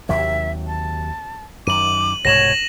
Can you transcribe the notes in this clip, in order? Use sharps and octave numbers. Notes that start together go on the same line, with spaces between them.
D#2 C3 F#3 E5
A5
F#2 D#3 D6 D#7 F#7
C2 G#2 B2 C#5 A#6 E7 F#7